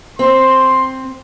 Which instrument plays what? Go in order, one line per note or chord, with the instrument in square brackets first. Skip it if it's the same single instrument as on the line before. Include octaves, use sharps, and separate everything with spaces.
[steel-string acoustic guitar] C4 [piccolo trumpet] C6